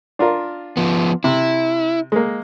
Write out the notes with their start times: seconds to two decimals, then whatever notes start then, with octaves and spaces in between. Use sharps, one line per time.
0.19 D4 F4 A#4
0.77 F3 B3
1.24 C3 E4
2.12 G#3 A#3